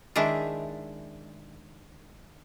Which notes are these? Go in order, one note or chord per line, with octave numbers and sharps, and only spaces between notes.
D#3 G#3 D4 E4